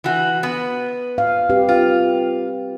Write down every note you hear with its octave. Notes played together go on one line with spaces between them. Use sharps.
E3 F#4
B3
F5
C4 G4 B4
F4